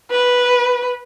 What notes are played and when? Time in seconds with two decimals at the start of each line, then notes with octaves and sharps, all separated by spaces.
0.11 B4